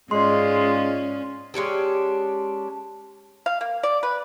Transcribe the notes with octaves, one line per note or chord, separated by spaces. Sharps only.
G#2 G#3 C#4 F4 D5 C6
G#3 C#4 D4 G4
F5
A#3
D5
B4